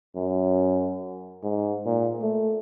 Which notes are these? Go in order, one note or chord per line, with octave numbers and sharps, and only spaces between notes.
F#2
G#2
A#2
A3